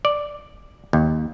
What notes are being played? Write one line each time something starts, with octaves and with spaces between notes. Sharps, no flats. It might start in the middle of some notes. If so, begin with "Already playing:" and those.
D5
D#2